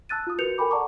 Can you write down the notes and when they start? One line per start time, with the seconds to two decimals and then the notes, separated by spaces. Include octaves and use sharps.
0.09 A5 E6 F#6 A6 D#7
0.27 F4 D#6
0.39 F#4 A#4 B4 G6 C#7 F7
0.58 A4 A#4 G5 G#5 B5 D6
0.71 D5 F#5 A5 A#5 C#6 D6